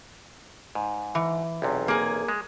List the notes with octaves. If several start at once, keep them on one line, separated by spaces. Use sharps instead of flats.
G#2
E3
B1 E2 C3
A#3 G#4
G#3